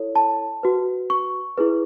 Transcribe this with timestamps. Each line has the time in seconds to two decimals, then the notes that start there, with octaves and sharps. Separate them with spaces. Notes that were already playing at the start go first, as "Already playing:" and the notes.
Already playing: E4 A4 C#5
0.15 A5
0.63 F#4 B4
1.10 C#6
1.58 E4 G#4 B4